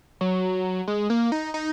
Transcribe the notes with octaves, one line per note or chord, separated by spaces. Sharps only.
F#3
G#3
A#3
D#4
D#4